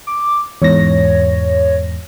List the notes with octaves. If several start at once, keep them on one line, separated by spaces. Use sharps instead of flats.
D6
E2 G#2 C#5 A#6